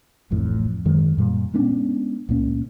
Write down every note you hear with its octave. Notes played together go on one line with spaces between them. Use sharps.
D1 A1 F2 A2
F#2 D#3 G#3
F#2 A#2 G3
G#3 B3 C#4 D4
C#2 A#2 A#3 C#4